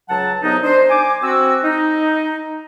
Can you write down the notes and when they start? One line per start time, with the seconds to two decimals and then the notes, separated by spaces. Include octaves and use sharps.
0.09 C#2 F#3 F#5 A5
0.43 C2 F#3 B3 D#4
0.63 D4 C5
0.90 G#5 D6
1.23 C4 F#4 E6
1.63 D#4